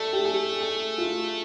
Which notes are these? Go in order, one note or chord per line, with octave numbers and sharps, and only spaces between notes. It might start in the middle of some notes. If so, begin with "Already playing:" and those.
Already playing: A3 A4 D5
G4
G#4
G#4
F4